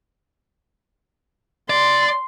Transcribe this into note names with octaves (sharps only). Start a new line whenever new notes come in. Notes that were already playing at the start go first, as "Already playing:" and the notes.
D5 C6